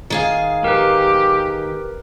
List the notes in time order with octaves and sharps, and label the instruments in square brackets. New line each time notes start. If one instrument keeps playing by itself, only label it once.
[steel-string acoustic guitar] D#3 G#4 F5
[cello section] G4 [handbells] A#4 B4